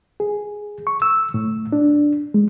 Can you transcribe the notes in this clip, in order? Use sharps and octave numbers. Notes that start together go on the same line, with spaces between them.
G#4
C#6
E6
A2
D4
G#3